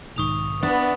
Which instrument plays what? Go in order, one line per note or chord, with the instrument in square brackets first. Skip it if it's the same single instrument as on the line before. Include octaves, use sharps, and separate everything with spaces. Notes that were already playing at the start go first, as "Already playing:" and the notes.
[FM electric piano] B1 G#2 D#3 [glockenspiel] C#6 D#6 F7
[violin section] B3 [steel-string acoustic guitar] D4 E4